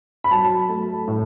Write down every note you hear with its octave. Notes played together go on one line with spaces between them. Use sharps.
B5
F#3 A5
A3
A2